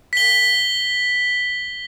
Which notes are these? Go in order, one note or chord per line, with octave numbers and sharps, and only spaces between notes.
B6 G7